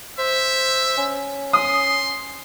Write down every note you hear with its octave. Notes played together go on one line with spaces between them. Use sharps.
C5 E5
C#4
C6 D#6